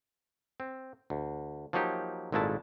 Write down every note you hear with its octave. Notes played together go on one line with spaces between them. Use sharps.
C4
D2
F3 F#3 A#3 D#4 G4
G#1 A#2 G#3 A3 E4 A5